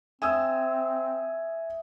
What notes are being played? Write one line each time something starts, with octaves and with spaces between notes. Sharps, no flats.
C4 E5 G#5 D#6 E6